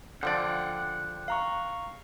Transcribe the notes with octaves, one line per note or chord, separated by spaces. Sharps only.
D3 F3 D5 F#5 G5
F5 A#5 C#6